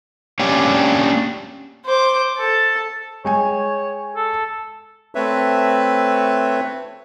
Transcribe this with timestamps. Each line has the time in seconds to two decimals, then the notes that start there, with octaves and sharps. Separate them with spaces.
0.39 A#3 C#4 D4 G4 C#5 G5
1.85 C5 D6
2.38 A4
3.25 G#3 C#5 G5 G#5
4.16 A4
5.15 A3 C4 B4 C#5 E5